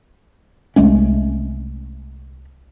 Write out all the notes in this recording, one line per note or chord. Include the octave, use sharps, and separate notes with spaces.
C2 G#3 A3 C#4